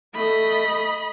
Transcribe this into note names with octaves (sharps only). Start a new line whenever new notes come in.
A3 D#5 B5